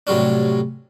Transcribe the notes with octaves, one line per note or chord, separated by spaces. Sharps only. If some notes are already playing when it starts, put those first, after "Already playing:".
A2 C3 F#3 G3 C#4 D4